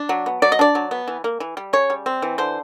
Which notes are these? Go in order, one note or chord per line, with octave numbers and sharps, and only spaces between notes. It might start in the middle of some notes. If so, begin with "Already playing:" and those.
Already playing: D4
F#3
B3
F#3 D5
D#5
D4 D5
F#3
B3
E3
A#3
E3
G3
C#3 C#5
G3
C4
E3
D3 C5